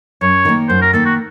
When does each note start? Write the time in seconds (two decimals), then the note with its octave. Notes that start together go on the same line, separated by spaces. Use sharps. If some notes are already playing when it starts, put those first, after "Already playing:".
0.21 F#2 C#5
0.45 D#3 A#3
0.69 F#2 C5
0.81 A#4
0.93 D#3 A#3 A4
1.05 F#4